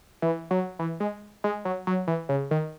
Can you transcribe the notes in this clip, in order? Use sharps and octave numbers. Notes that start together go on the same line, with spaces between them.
E3
F#3
E3
G#3
G#3
F#3
F#3
E3
C#3
D#3